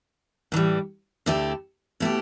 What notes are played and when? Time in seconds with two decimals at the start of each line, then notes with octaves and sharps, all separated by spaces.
0.52 A2 E3 G3
1.26 D2 D3 A3 E4 G4
2.00 B2 A3 E4 G4